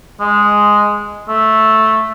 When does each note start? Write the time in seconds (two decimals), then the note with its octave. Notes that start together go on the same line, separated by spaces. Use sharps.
0.20 G#3
1.28 A3